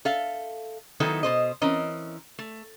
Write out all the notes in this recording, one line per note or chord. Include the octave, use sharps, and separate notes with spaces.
A4 E5 F5
D#3 F#3 B3 D#4 E4 A4
B2 C5 D#5
E3 C4 C#4 A#4 D#5
A3